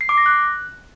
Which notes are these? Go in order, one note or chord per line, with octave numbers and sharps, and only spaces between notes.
C7
D6
A#6
F#6